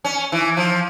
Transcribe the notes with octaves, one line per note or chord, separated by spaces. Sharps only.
C#4
E3
F3